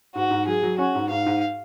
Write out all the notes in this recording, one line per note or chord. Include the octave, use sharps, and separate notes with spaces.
G#2 F#4
G#2
F#3 G#4
F#3
C#4 F#4
G#2
G#2 F5
G#2